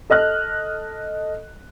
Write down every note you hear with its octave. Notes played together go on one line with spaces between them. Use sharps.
A4 D#5 F6 F#6